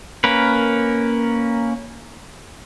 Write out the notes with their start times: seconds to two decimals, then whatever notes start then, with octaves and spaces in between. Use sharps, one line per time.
0.24 A#3 C#4 A#4 B4